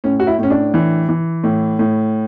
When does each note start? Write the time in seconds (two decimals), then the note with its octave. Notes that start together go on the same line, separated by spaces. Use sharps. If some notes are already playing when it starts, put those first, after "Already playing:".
0.04 A2 C#4
0.20 F#4
0.27 E4
0.39 A2 C#4
0.50 D4
0.74 E3
1.09 E3
1.44 A2
1.79 A2